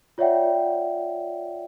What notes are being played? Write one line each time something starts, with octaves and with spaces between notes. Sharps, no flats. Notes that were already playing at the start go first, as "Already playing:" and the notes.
F4 C#5 D5 E5 F#5 G5